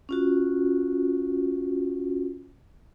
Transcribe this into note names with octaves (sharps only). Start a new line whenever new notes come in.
C#4 F4 F#4